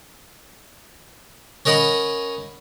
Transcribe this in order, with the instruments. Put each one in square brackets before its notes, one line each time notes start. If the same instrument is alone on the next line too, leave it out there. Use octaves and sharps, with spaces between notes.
[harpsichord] C#4 A#4 D#5 F#5 B5